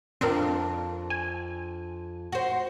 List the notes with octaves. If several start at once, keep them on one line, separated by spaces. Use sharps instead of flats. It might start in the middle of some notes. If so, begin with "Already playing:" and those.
F2 C4 D4 F4 A#4
G#5
F#4 C5